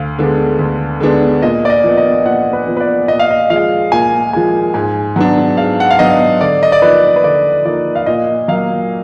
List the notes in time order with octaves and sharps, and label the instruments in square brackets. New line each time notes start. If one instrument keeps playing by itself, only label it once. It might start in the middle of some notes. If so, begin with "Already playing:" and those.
Already playing: [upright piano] D2 [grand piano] F5
[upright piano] D3 G#3 B3 D4
D2
D3 G#3 B3 D4
[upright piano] A#2 [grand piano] D#5
[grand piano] D5
D#5
[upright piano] F3 B3
[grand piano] D#5
[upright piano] A#2 [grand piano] F#5
[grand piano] B4
[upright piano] F3 B3
[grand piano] B4
D5
[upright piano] A#2 [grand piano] D#5
[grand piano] F5
D#5
[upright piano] F3 G#3 [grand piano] F5
[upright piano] A#2 [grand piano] G#5
[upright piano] F3 G#3 [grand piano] G#5
[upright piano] G#2 [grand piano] G#5
[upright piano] F#3 B3 D4 [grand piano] F#5
[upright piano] G#2 [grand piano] F5
[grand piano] F#5
F5
[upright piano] F#3 B3 D4 [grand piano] D#5
[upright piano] D3 [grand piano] D5
[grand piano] D#5
D5
[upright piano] F3 A#3 D#4 [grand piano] B4
[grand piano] B4
[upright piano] D3 [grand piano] D5
[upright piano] F3 A#3 D#4 [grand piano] D5
[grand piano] F5
[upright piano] A#2 [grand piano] D#5
[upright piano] F#3 A#3 [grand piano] F5